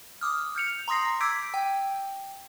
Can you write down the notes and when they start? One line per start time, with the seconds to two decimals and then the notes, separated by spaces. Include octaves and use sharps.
0.21 D6 D#6 F6
0.55 F6 G6 C#7 F7
0.88 A#5 C6 D#6 A#6 C7
1.21 D6 E6 G6 G#6 B6 D7
1.54 G5